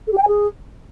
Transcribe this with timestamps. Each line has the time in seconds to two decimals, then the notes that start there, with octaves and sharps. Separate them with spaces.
0.07 A4
0.12 G4
0.17 G5
0.22 G#5
0.28 G#4